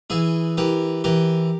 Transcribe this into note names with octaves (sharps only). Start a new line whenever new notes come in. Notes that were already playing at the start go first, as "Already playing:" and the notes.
E3 E4 G#4
E3 G4 A#4
E3 G4 A#4